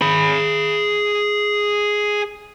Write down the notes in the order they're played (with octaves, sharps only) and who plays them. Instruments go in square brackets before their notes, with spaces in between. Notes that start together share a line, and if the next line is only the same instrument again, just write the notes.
[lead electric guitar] G#4 B5